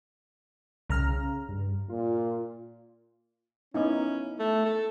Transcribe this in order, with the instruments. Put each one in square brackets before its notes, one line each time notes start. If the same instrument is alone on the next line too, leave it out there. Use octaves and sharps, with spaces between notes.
[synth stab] C2 A#5 F6 [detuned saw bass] C#3
[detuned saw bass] G2
[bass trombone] A#2 [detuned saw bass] F4
[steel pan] B3 D#4 E4 [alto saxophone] C#4
[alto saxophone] A3
A4